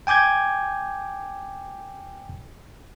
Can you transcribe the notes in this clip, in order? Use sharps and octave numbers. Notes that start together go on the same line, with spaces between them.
G5 G#5 D6 G6 G#6